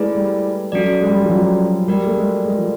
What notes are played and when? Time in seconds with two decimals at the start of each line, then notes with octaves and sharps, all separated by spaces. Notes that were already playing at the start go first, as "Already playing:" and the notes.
Already playing: G#3 A3 E4 G#4 B4 D5
0.15 G3
0.72 F#3 C#4 F#4 A4 D5
1.01 G#3
1.10 G3
1.17 G#3
1.24 F3
1.30 F#3
1.88 G3 F#4 A#4 D5
2.07 A3
2.17 G#3
2.45 G#3
2.58 F3